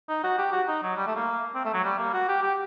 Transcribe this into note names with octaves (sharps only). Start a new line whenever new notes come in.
D#4
F#4
G4
F#4
D#4
F#3
G3
A3
A#3
C4
A3
F#3
G3
A#3
F#4
G4
G4